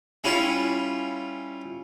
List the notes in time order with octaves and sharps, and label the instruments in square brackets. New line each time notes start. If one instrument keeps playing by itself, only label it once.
[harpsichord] G3 C#4 E4 F4